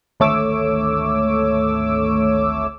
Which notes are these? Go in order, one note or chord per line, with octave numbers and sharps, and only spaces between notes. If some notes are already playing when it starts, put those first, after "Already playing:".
G#1 D2 A3 C#5 D6 E6